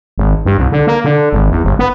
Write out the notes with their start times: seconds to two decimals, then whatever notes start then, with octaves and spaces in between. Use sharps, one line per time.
0.18 G#1
0.45 G2
0.58 C2
0.72 D3
0.87 A#3
1.04 D3
1.32 G#1
1.51 E2
1.64 G1
1.79 B3